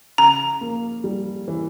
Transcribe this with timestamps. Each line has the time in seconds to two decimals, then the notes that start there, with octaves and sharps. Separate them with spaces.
0.18 C#3 A#5
0.61 A#3
1.04 G3
1.48 E3